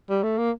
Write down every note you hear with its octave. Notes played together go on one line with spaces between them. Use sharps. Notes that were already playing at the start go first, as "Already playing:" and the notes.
G3
A3
A#3